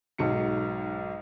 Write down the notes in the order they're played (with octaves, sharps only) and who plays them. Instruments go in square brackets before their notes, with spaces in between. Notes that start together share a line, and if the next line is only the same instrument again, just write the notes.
[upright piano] B1 G#2 F#3 C#7